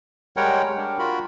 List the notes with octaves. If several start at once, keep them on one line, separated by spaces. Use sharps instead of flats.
G3 G#3 A#4 C#5 F#5 G5
G3 D4
F4 F#4 A#4 B5